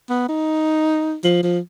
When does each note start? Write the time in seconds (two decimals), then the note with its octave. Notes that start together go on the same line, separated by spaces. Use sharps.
0.09 B3
0.29 D#4
1.24 F3
1.43 F3